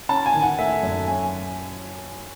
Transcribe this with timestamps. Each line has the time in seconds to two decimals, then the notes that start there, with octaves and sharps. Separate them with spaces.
0.09 C#4 A5
0.26 G#5
0.34 D#3
0.42 F#5
0.59 A3 E5
0.83 F#2
1.08 C#4 G#5